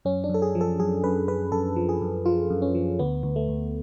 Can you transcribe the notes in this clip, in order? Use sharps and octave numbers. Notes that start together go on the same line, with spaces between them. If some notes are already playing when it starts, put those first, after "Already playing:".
F#2 C#4
D4
F#2 A4
G#4
F3
A4
F#2 G#4
F#2 B4
F#2 B4
F#2 A4
F3
G#4
F#2
F3 F4
F#2
C#4
F3
D2 B3
D2
A3
D2